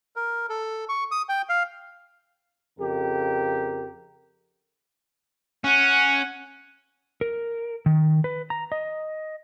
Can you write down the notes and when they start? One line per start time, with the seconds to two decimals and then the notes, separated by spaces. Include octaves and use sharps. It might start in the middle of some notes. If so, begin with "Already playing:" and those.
0.16 A#4
0.49 A4
0.89 C#6
1.11 D#6
1.29 G5
1.49 F5
2.79 F2 C#3 G4 A#4
5.64 C#4 F#5
7.21 A#4
7.86 D#3
8.24 B4
8.50 A#5
8.72 D#5